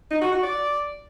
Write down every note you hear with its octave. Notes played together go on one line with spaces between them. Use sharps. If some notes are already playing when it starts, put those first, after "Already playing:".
D#4
F#4
F#4
D5